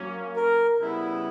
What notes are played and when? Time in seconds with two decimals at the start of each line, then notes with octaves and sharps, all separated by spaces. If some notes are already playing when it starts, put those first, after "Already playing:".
Already playing: F#3 A#3 C#4
0.36 A#4
0.79 C#3 G3 B3 E4